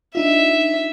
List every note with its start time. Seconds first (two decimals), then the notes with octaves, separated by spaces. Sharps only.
0.15 D4 D#4 F4 E5